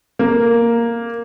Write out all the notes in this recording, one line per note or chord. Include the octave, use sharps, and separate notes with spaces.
A#3